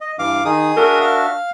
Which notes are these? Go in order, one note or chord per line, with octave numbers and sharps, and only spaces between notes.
D#5
G2 E3 F5 D6
D#3 D#4 G#4 D#6
D4 F#4 A#4 E5
F5